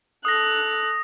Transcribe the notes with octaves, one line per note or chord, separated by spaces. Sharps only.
A4 D#6 F#6 A#6